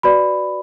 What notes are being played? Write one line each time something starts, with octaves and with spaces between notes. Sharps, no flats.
F#4 B4 D5 B5